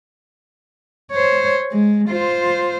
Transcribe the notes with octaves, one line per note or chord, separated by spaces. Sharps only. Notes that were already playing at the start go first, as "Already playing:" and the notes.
C5 C#5
G#3
F4 C5